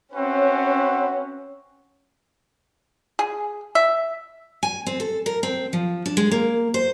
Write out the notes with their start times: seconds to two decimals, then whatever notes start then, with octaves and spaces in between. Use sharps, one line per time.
0.14 C4 C#4 F#4 B4 E5
3.19 G#4
3.75 E5
4.63 G#5
4.87 C4
5.00 A4
5.26 A#4
5.43 C4
5.73 F3
6.06 D4
6.17 G#3
6.31 A#3
6.74 C5